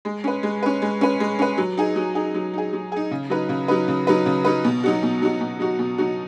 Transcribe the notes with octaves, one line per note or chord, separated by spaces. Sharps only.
G#3
C#4 B4
G#3
C#4 B4
G#3
C#4 B4
G#3
C#4 B4
F#3
D#4 G#4
F#3
D#4 G#4
F#3
D#4 G#4
F#3
D#4 G#4
C#3
F#3 D#4 B4
C#3
F#3 D#4 B4
C#3
F#3 D#4 B4
C#3
F#3 D#4 B4
B2
F#3 D#4 F#4
B2
F#3 D#4 F#4
B2
F#3 D#4 F#4
B2
F#3 D#4 F#4